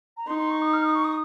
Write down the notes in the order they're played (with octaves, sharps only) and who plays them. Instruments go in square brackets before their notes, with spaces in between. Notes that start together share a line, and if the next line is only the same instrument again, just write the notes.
[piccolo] A#5
[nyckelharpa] D#4 [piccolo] C6
[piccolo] C6
C#6
D#6
F6
D#6
C#6
D#6